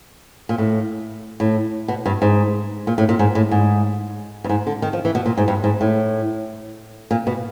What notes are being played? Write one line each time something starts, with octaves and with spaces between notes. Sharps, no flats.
A#2
A2
A2
B2
G2
G#2
A#2
A2
A#2
G#2
A2
G#2
G2
G#2
D3
D#3
F3
E3
B2
A#2
G#2
G2
G#2
A2
A#2
B2